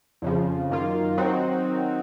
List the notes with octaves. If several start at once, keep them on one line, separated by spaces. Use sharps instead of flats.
F2 C#3 F3
F#2 D#3 A#3 F4
D#3 F#3 C4 D#4 F#4